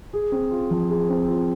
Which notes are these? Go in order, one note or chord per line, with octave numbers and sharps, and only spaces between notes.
G#4
C4
F4
F3
G#4
C4
F4